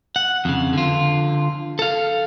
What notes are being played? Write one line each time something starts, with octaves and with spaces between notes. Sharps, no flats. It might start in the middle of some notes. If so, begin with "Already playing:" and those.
F#5
F2 C#3
D3 F4
A4 F5